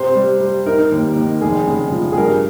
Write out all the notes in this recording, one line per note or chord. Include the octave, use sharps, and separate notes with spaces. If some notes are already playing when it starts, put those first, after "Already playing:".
Already playing: C3 C5
G3
G3
D#4 A#4
D#2
D#3
F1 G#4
C#3
F3
G#4
G2 A#4